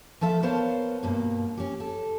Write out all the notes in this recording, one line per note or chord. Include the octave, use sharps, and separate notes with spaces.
F3 A3 A4 E5 F5
B3 A#4 C5 C#5 F5 A5
G2 B2 A#3
C#4 G4
A4